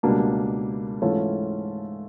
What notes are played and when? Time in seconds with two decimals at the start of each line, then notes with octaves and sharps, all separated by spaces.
0.03 C#2 B2 G3 A#3 D4
1.02 G#2 E3 A3 C#4 F4